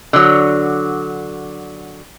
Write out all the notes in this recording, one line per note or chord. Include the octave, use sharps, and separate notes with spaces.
D3 F#3